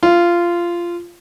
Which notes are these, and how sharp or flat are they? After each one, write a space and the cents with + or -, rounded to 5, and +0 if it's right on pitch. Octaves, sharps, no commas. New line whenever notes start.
F4 -15